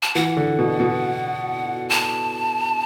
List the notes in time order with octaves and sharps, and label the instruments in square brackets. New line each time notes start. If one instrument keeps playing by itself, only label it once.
[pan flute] A5
[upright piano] E3 [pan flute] F#5
[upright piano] D3
B2
B2
[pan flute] A5